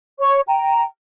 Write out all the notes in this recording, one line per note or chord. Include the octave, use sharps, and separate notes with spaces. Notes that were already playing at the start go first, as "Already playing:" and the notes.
C#5 C#6
G5 A#5